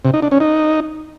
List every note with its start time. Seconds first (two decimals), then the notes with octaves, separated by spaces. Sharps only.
0.05 C3
0.14 D#4
0.22 D4
0.31 C#4
0.40 D#4